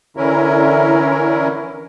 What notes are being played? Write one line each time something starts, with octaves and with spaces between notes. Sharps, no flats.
D3 E3 C#4 E4 A#4